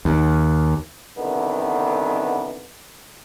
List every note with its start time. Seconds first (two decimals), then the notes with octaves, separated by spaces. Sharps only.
0.05 D#2
1.18 C2 D3 D#3 B3